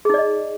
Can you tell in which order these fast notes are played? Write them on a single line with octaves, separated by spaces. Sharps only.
G#4 D#4 D5 D#5